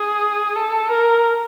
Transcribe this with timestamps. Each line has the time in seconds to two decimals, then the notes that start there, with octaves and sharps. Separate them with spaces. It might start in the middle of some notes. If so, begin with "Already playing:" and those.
Already playing: G#4
0.55 A4
0.90 A#4